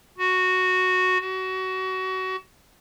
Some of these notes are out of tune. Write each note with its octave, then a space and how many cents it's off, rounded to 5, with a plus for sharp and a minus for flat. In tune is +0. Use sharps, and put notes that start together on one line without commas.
F#4 -5
F#4 +25